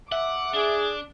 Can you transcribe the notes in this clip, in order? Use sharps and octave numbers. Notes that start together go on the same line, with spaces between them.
E5 F#5 D6
D4 G#4